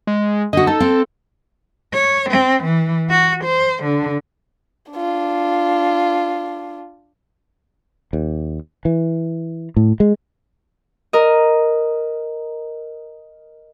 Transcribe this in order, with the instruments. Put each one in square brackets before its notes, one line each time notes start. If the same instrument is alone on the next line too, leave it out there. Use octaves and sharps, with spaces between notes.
[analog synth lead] G#3
[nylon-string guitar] D3 F#4 [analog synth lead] D#5
[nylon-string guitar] D#4 [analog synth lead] A4
[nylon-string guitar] C4 F5
[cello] C#5
C4
E3
F#4
C5
D3
[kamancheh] D4 F4
[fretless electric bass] D#2
E3
A2
G#3
[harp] A#4 D#5